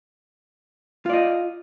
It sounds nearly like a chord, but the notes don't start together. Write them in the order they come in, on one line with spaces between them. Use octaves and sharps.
F4 D5 D#5